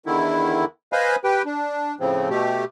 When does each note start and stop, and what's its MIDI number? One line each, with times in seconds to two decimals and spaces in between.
0.06 0.65 40
0.06 0.65 50
0.06 0.65 51
0.06 0.65 64
0.93 1.16 71
0.93 1.16 72
0.93 1.16 75
0.93 1.16 77
0.93 1.16 80
0.93 1.16 83
1.24 1.42 67
1.24 1.42 71
1.24 1.42 79
1.45 1.95 62
2.00 2.29 45
2.00 2.29 49
2.00 2.29 53
2.00 2.29 60
2.30 2.64 47
2.30 2.64 57
2.30 2.64 67